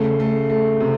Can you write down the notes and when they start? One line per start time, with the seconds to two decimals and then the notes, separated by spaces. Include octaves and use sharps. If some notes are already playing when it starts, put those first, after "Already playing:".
Already playing: C#3 A3
0.20 A3
0.50 A3
0.80 C3